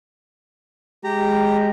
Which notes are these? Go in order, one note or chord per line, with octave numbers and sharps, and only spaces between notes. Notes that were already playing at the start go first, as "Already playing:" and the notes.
G#3 G4 A#5